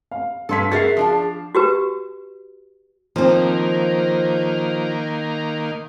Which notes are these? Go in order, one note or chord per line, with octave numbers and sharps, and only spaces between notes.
F5
G2 A#3 C#4 A4 C6 B6
F#4 G#4 A#4 E5 A6 C7
F3 D4 F5
F#4 G4 B4
D#3 F3 A#3 C4